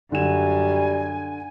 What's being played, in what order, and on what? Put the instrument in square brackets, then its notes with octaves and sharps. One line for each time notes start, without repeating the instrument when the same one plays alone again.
[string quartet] F#2 [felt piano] D3 E7 [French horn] G3 [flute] G#5